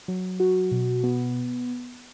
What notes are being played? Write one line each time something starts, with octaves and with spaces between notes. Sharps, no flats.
F#3
F#4
B2
B3